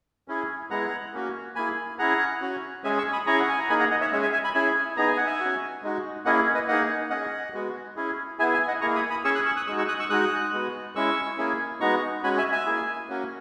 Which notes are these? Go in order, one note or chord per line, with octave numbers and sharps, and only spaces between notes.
C#4 E4 G#4
G#3 B3 E4 G#4 F#5 A#5
A#3 C#4 F#4
A#3 E4 G#4 G#5 B5
C#4 E4 G#4 F#5 A#5
C#4 F#4
G#3 C#4 G#4 E5 G#5
C#6 E6
B5 D#6
C#4 E4 G#4 A#5 C#6
F#5
G#5
A#5
A#3 D#4 G#4 G#5 B5
F#5 A#5
D#5 F#5
C#5 E5
G#3 C#4 G#4 C#5 E5
E5 G#5
E5 G#5
G#5 B5
C#4 E4 G#4 E5 G#5
B3 D#4 G#4 A#5
G#5
F#5
E5 G#5
C#4 F#4
G#3 D#4 F#4
A#3 C#4 E4 G#4 D#5 F#5
B4 D#5
A#3 D#4 G#4 D#5 F#5
C#4 G#4 D#5 F#5
G#3 B3 F#4
C#4 E4 G#4
B3 E4 G#4 E5 G#5
E5 G#5
D#5 F#5
A#3 E4 G#4 A#5 C#6
B5 D#6
B5 D#6
C#4 G#4 C#6 E6
D#6 F#6
C#6 E6
D#6 F#6
G#3 D#4 F#4 C#6 E6
C#6 E6
D#6 F#6
C#6 E6
G#3 D#4 F#4 D#6 F#6
G#3 B3 F#4
G#3 C#4 E4 C#6 E6
A#3 C#4 E4 G#4
G#3 B3 D#4 F#4 A#5 C#6
G#3 C#4 F#4 G#5 B5
E5 G#5
E5 G#5
A#3 E4 G#4
A#3 C#4 F#4